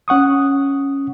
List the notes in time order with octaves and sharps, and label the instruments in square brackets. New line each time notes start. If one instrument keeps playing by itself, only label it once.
[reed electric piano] C#4 F#5 C#6 D#6